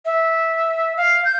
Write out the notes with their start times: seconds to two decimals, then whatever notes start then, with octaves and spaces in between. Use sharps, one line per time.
0.05 E5
0.97 F5
1.25 G6